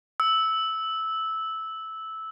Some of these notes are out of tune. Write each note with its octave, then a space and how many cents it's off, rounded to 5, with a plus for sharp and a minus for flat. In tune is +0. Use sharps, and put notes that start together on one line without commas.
E6 -10